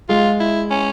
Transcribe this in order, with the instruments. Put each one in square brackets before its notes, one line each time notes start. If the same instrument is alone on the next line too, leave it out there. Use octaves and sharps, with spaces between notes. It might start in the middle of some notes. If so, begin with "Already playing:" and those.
[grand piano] G#3 [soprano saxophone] F4
[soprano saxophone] E4
C#4